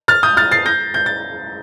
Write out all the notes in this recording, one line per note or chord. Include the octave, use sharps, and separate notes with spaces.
F6 A6
D#6 G6
F6 A6
A6 C7
G6 A#6
G6
A6